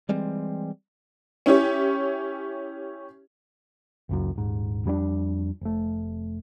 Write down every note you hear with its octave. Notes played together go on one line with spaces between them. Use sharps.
E3 G3 G#3 C4
C#4 E4 G4 C#5
F#1 C#2 F#2
D#1 G#2
F2 G3 C#4 D4
F1 A3